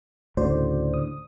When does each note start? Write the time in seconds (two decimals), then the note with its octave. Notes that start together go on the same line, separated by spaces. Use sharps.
0.37 D2 A2 C#3 F#4 C5 D5
0.94 D#6